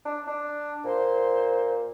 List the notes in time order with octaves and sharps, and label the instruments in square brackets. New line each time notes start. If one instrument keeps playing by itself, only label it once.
[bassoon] D4
D4
[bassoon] A#2 [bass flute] C5